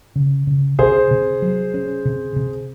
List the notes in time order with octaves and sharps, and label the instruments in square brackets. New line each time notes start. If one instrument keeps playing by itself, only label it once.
[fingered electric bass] C#3
C#3
[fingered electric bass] C3 [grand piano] G#4 C5
[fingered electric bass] C3
F#3
C#4
C3
C3